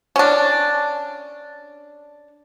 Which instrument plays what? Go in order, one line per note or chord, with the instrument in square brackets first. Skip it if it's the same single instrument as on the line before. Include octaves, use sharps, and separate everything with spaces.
[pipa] C#4 D4